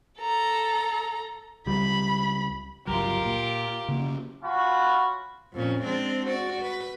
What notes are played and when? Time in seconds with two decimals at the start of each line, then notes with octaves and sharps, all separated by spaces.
0.19 A4 A#5
1.66 C#2 G3 B5
2.87 G1 C#2 F#3 F4 G4 A#4
3.25 A#2
3.88 C#3 A#3 C#4
4.43 C#4 F4 F#4 B5
5.53 F2 A#2 C#4
5.82 G#3 C4 D4
6.26 F#4 D5
6.62 B4